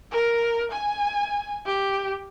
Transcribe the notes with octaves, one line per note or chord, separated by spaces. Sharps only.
A#4
G#5
G4